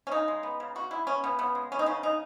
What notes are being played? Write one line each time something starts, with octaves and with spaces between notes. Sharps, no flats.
C#4
C#3 D#4
G#3
B3
C#3
C#3 F#4
G#3 E4
B3 C#4
C#3 B3
C#3 B3
G#3
B3 C#4
D#4
C#3 C#4
C#3 D#4